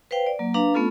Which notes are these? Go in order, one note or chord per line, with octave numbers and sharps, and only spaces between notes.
B4 C5 F5 G5
D5
F#3 A#3
D4 B4 F5 A#5
A3 B3 C#4 F4 A4